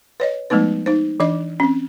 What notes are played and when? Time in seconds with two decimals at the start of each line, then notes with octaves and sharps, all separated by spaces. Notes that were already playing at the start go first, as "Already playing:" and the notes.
0.20 B4 C#5 D#5
0.50 F3 G#3 A3 B3 D#4 B4
0.86 D#4 C5
1.20 E3 D4 D#5 D6
1.60 C4 C#4